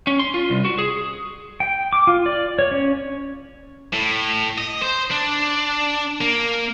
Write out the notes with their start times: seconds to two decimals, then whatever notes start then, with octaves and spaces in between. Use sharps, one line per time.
0.07 C#4
0.19 C6
0.34 F4
0.50 C2
0.65 F#4
0.79 G#4
1.60 G5
1.93 D6
2.07 F4
2.26 D5
2.59 C#5
2.71 C#4
3.93 A2
4.58 D#5
4.82 C5
5.11 D4
6.21 A#3